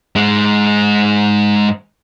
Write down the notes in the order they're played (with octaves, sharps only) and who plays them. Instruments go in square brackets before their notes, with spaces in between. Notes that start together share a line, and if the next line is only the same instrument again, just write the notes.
[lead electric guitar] G#2 G#3